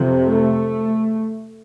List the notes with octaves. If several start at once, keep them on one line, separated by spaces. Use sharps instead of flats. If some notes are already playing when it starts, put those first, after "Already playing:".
Already playing: F2 C3
A3